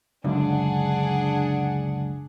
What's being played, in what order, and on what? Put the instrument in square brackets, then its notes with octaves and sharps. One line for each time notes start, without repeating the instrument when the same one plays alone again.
[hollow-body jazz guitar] C#2 F#2 D3 [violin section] D4 G#4 F#5